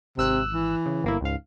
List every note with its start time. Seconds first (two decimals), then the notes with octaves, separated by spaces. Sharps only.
0.18 G#1 C3 E6 F#6
0.53 E3
0.86 C#3
1.04 G1 A#3 E4
1.21 C#2 G#2 F5